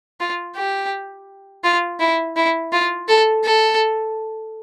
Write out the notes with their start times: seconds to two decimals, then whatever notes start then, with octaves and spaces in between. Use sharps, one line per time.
0.20 F4
0.56 G4
1.64 F4
2.00 E4
2.37 E4
2.72 F4
3.08 A4
3.44 A4